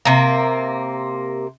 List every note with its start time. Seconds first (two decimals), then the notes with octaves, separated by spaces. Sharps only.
0.05 C3 A#3